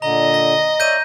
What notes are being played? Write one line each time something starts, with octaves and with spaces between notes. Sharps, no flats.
A#2 D3 D#5 A#5
A#6
C#5 D5 E5 G6 A#6 D#7